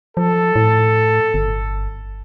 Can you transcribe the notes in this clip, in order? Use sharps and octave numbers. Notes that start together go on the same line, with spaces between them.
F3 A4
A2
G1